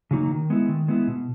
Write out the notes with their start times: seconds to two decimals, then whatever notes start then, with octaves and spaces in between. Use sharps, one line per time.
0.11 C#3 F#3 A#3 D#4
0.31 D#3
0.50 G#3 B3 E4
0.69 D#3
0.88 G#3 B3 E4
1.07 B2